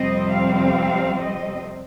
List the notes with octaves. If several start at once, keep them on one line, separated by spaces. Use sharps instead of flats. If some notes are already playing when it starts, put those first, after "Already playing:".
Already playing: F2 C3 G3 C4 D#5
F5
D#5